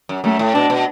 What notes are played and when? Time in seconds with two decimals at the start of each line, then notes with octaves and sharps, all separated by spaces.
0.09 F#2
0.24 F#2 A3
0.39 A2
0.54 B2 D4
0.70 B2